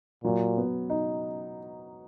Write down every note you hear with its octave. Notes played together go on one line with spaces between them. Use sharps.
A#2 F#3
B3
D#4